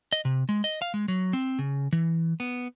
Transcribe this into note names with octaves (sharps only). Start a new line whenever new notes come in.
D#5
C3
G#3
D#5
F5
G#3
F#3
C4
C#3
E3
B3